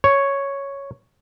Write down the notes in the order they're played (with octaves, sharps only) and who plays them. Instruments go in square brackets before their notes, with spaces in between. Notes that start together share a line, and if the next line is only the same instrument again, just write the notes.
[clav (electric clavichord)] C#5